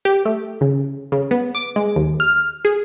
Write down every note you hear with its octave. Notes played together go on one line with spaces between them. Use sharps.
G4
A3
C#3
C#3
B3
D6
G#3
D#2
F6
G#4